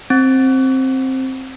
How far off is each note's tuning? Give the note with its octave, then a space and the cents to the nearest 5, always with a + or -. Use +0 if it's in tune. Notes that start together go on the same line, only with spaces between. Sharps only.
C4 +10